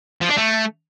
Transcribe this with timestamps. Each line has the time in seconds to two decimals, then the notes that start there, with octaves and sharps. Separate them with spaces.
0.22 F3
0.30 D4
0.38 A3